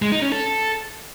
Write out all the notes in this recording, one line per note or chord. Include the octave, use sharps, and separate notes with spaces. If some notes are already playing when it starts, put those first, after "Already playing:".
G#3
D#4
C#4
A4